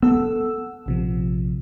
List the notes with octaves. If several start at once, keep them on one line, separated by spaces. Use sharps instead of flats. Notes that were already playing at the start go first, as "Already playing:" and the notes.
B3 A4 F#5 E6
A#1 C3 F3